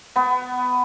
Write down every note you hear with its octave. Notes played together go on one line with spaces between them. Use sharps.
B3